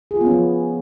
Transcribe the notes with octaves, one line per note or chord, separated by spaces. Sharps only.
G#4
F4
B3
C#4
F3